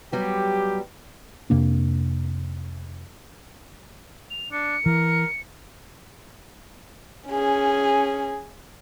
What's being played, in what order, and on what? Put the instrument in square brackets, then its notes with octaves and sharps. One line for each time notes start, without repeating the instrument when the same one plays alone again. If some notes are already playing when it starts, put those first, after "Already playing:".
[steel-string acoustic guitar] F#3 G3 B3 [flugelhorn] G4
[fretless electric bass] F2 C3 A#3 D4
[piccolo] F7
[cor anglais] D4 [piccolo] C#7
[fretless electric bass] E3 [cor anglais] A#4
[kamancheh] C#4 G#4